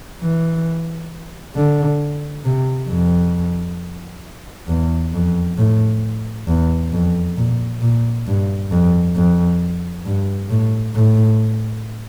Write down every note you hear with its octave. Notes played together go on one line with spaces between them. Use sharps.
E3
D3
C3
F2
E2
F2
A2
E2
F2
A#2
A#2
G2
F2
F2
G2
A2
A2